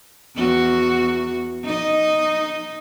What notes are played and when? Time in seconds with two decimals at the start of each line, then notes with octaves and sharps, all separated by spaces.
0.36 E2 F#4
1.65 D#4 D#5